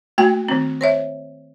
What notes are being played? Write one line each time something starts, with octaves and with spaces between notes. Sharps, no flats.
A3 A#3 F#4 G5 G#5
D#3 C4
C5 C#5 E5